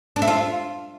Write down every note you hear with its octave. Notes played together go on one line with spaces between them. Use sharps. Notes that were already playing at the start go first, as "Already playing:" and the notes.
D4
E4
F4